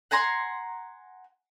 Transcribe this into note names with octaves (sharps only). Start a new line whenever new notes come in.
F#5 G#5 A#5 C6